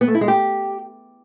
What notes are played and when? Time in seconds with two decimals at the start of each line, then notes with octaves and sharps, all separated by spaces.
0.01 B3
0.08 A3
0.14 E4
0.21 G#3
0.28 G4